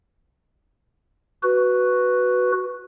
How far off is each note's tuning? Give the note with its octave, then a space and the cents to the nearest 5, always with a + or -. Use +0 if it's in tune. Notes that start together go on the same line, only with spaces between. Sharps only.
F#4 +0 B4 +0